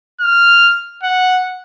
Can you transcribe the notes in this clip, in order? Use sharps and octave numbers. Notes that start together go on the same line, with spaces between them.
F6
F#5